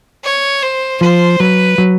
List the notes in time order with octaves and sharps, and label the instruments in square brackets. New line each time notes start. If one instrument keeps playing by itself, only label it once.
[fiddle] C#5
C5
[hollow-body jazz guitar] F3 [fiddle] C5
[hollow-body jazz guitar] F#3 [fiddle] B4
[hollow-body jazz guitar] F#3